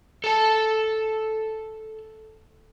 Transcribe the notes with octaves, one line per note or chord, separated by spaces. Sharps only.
A4 A5